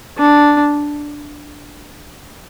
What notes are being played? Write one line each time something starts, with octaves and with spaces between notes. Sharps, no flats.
D4